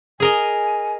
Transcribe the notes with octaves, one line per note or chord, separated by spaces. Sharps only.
G#4 A#4 D#5 G#5